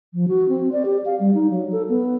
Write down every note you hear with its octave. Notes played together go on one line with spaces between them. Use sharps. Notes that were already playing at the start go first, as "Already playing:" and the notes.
F3
F#4
C4
D5
G4
F5
G3
D#4
F#3
A4
B3